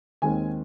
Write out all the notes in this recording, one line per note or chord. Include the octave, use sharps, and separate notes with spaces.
D#2 D#3 G#3 C4 G#5